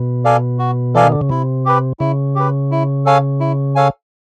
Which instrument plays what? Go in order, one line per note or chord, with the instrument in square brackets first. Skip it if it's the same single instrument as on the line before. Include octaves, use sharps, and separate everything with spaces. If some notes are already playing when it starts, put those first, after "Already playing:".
Already playing: [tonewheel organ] B2
[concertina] A4 D5 F5 G#5
F#4
[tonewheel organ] E3 [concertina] A4 D5 F5 G#5
[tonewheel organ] D#3
D3
C#3
[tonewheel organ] C3 [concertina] E4
[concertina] G4 B4
[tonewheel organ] C#3 [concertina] E4
[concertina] G4 B4
E4
A4 C#5 F5 G#5
E4
A4 C#5 F5 G#5